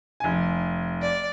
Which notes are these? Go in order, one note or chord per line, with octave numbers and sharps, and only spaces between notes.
F1 G#5
D5